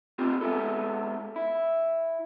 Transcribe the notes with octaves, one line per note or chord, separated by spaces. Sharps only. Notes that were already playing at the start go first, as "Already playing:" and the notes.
B3 C4 F4 G4
G#3 B3 E4 A4
E4